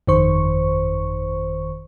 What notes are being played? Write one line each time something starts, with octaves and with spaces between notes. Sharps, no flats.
G1 F2 D#3 C5 C#6